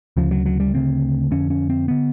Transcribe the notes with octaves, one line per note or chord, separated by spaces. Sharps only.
D2 C#3 F3
F#3
F#3
G3
D2 C#3 C4
F2 D3 C#4
C#4
C4
D3 B3